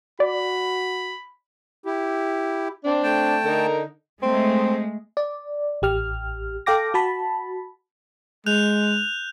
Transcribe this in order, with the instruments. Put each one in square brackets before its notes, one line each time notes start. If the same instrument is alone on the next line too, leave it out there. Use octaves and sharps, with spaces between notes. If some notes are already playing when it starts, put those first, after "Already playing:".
[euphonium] F#4 [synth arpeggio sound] D5 [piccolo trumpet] B5
[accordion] E4 G4
[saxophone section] C4 D4
[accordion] A3 G5 A5
[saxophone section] D3 D#4 A#4
[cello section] G#3 A3 [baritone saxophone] C4
[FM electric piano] D5
A1 G4 F6
A4 F5 G5 D6 A#6
F#4 A5 B5
[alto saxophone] G#3 [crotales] F#6 G6 F7